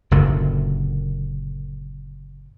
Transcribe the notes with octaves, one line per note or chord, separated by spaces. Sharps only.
F#1 F#2 A#2 D3